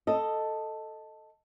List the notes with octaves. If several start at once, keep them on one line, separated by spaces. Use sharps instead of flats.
A4 D#5